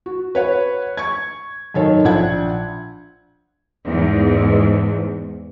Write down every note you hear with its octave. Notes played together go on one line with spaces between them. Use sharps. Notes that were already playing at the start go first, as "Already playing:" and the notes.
F#4
B4 C#5 F#5
C#6 G#6
F#2 D#3 A4 C#5
A#1 D4 E5 F#5 G#6
E2 G#2